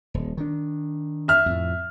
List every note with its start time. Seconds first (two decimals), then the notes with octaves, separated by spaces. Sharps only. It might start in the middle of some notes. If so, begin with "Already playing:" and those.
0.14 D#1
0.37 D#3 D4
1.28 E5 F6
1.46 F2 A2